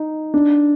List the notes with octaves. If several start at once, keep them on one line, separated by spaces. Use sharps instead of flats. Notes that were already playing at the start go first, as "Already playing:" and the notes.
Already playing: D#4
D4